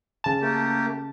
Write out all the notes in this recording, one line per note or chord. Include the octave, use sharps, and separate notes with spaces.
C#3 A5
A3 A#3 G4